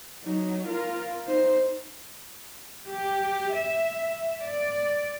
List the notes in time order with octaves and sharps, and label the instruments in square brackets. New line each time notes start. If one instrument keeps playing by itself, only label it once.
[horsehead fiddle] F#3 D#4
F4 A#4
D#4 C5
[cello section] G4
E5
D5